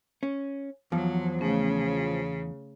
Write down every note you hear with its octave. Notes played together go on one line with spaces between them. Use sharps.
C#4
E2 F3 F#3
C#3 A3 C#4